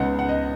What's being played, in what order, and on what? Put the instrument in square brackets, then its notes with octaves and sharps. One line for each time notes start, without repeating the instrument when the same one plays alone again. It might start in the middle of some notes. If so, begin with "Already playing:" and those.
Already playing: [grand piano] C#2 C#3 B3 D#4 F#5
F#5
D#5